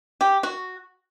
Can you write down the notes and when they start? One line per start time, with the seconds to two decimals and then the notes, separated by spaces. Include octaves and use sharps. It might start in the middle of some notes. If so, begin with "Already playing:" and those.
0.21 G4
0.43 F#4